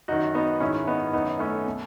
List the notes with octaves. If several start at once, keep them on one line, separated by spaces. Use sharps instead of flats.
F#2 D#3 D#4 F#4
B3 D#4
G#2 D#3 C#4 E4
B3 D#4
F#2 D#3 B3 D#4
A3 C#4
B2